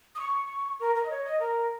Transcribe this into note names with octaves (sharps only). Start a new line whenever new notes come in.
D#6
C#6
A#4
A#4
D#5
C#5
D#5
A#4